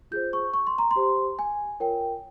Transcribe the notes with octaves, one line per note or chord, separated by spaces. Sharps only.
F4 G#4 C5 G6
C#6
C#6
C6
A#5
C6
G4 C5
G#5
F4 A#4 C#5 G5